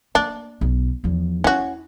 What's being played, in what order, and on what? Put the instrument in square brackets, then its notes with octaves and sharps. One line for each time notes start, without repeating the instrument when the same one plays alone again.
[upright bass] A#3 [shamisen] D4
[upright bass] B1
E2 F3
[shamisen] C#4 F#4 [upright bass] E4